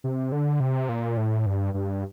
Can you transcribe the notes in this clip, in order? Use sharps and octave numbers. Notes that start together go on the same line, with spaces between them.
C3
D3
C3
A#2
A2
G2
G2